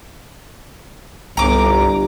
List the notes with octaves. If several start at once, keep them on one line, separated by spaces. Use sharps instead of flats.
G1 C2 A#5 D6